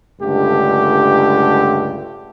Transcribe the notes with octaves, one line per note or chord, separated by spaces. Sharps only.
C#2 G2 D3 A3 G4